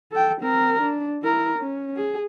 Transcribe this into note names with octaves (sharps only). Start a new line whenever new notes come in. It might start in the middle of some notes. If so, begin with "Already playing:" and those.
A4 G5
C4 A#4
D4
E4 A#4
C#4
G#4